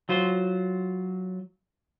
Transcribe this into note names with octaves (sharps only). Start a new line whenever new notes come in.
F#3 F4 C5